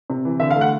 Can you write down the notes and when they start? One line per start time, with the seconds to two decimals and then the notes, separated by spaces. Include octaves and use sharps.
0.10 C3
0.25 E3
0.40 D3 E5
0.51 F5
0.56 A3
0.61 F#5